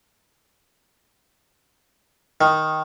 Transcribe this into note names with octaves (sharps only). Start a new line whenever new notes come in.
D#3